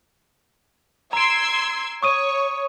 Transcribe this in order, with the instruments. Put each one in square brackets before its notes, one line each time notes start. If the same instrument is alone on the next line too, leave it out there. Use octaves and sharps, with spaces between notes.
[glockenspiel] A#5 D7 [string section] C6 E6 G#6
[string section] C#5 [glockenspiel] C#6 D#6 D#7